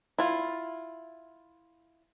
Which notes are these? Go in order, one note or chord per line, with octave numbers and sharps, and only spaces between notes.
E4 F4